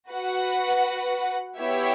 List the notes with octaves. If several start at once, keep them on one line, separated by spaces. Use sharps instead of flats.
F#4 B4 F#5
B3 E4 G4 C#5 E5